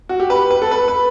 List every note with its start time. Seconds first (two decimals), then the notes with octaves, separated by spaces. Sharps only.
0.09 F#4
0.20 G4
0.30 B4
0.51 B4
0.62 A4
0.71 B4
0.88 B4